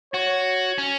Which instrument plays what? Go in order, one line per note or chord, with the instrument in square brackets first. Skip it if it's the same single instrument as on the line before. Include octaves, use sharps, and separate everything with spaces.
[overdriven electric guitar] F#4 [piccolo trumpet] C#5
[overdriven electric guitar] C#4